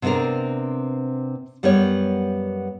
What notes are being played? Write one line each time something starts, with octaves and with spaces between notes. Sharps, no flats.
C3 B3 C4 D4 A#4
F#2 G3 B3 A#4 C#5